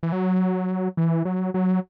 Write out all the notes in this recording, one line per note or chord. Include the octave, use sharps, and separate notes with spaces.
E3
F#3
E3
F#3
F#3